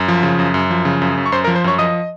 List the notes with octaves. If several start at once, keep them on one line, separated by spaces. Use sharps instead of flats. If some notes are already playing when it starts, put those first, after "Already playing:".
Already playing: F#2
F3
C#3
F#2
F#2
F3
C#3
F#2
F#2
C#6
F#2 C5 C6
A#4 A#5
F3
C5 C6
F#2 C#5 C#6
F3 D#5 D#6